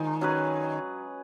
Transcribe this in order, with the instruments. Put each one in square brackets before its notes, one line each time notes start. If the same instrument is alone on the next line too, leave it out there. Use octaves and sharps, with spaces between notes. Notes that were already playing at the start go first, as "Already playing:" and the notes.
Already playing: [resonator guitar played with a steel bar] D#3 [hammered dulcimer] F3 G#3
[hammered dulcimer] F#3 C#4 G#4 B4